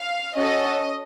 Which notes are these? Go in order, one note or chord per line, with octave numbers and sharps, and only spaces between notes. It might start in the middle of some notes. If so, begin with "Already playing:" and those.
Already playing: F5
C#4 F#4 A4 D#5